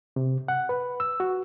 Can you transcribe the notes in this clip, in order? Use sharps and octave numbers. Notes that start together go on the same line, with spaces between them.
C3
F#5
B4
E6
F#4